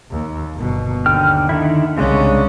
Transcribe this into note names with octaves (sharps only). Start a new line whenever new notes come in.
D#2
G1 B2
D#2 D3 G5 F6
D3 D#3 E4
C2 C#3 G#3 C#4 D4